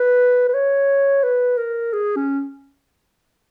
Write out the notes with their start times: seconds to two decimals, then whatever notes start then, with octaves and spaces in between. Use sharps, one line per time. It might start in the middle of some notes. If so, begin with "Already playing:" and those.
Already playing: B4
0.49 B4
0.54 C#5
1.23 B4
1.58 A#4
1.93 G#4
2.16 C#4